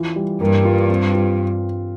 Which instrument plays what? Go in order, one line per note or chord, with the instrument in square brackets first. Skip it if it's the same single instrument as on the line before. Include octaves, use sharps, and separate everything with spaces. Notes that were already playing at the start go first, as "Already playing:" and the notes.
Already playing: [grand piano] E3 F4
G3
[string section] G2 [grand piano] A#3
[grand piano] F4
C4
F4